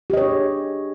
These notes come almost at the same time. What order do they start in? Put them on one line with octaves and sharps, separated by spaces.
G4 D#5 C#5 D4 G#4